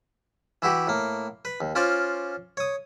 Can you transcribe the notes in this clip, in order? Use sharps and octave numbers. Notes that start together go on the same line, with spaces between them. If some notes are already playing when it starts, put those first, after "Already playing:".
E3 E4 F#4 G4
A2 A#3
B4
D#2
C#4 F4 C5 D5 F5
C#5 D#6